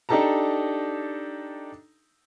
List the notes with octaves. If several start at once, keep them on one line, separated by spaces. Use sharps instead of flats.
D4 D#4 G4 A4 A5 A#5